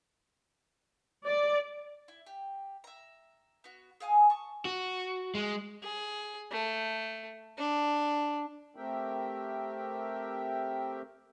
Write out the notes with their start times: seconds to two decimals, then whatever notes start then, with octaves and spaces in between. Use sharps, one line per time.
1.27 D5
2.08 E4
2.26 G4
2.84 E5 A#5
3.64 B3 F#4
4.00 G#4 F5 G#5 D#6
4.30 A5 C#6 D#6
4.65 F#4
5.35 G#3
5.83 G#4
6.52 A3
7.58 D4
8.76 A3 C4 G4 A#4 E5 G5